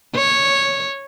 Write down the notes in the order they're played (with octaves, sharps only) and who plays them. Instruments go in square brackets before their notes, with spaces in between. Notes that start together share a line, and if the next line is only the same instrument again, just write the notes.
[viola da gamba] C#5